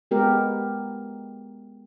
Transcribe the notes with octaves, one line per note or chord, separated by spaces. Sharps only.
G#3 B3 G4 A#4